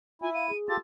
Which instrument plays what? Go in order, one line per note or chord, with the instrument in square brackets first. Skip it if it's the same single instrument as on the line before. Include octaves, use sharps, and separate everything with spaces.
[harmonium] E4 [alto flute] F4 [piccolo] G#5
[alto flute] F5 [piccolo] D#7
[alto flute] G#4
[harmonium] F4 G4 A4 [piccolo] A6